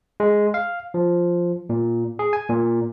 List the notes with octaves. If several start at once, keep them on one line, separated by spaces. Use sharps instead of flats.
G#3
F5
F3
A#2
G#4
G#5
A#2